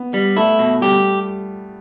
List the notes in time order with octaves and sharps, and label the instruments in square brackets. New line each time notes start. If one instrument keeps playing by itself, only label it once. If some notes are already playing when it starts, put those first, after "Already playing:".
Already playing: [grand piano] B3
[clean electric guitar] G3
[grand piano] A3 [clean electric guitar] E4
[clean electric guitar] B2
[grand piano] G3 [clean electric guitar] G4